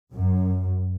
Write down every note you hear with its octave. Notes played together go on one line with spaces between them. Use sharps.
F#2